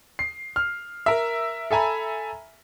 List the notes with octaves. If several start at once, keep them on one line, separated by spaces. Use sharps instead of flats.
C7
F6
A#4 E5
A4 E5 G#5 A#5 B5